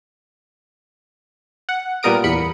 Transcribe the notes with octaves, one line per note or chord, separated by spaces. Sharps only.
F#5
A#2 G3 B3 A#4 D#6 D7
E2 B5 C#7